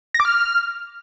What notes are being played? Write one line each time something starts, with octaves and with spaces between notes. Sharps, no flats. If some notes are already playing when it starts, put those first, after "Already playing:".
A#6
D6
F6